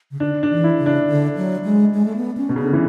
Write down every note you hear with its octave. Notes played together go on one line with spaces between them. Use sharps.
C#3
D3 D4
D4
E3
E4
C#3
D4
D3
F#3
G#3
G#3
A3
B3
C#4
B2
C#3 B3
D3
E3